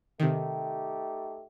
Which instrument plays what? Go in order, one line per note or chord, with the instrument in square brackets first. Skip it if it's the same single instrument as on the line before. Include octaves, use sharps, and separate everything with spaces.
[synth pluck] C3 D#3 [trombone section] A3 D#4 G4